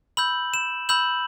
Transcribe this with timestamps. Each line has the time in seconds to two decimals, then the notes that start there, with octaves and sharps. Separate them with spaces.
0.17 B5 E6 G6 F#7
0.54 E7
0.89 B5 E6 G6 F#7